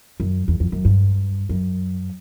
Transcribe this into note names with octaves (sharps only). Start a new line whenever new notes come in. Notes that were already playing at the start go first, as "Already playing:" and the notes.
F#2
E2
F2
F#2
G2
F#2